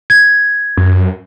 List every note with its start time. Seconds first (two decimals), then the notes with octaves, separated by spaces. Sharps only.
0.10 G#6
0.77 F#2